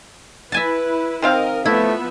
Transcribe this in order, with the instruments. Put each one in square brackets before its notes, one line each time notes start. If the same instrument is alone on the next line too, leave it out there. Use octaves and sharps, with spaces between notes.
[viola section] E4 B4 [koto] E5 G#5 A5
[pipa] D#3 C4 F5 [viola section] A#4 D#5
[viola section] F3 B3 E5 [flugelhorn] A3 [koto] E4